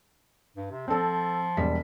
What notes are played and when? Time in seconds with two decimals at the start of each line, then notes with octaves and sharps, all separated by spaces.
0.56 G2
0.70 C3
0.88 F3 C4 A4
1.57 E1 G3 B6